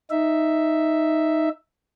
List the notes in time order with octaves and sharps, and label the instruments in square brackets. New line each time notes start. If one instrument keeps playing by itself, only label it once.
[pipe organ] D#4 E5